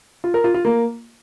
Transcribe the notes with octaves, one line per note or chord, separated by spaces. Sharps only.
F4
A#4
F4
F4
A#3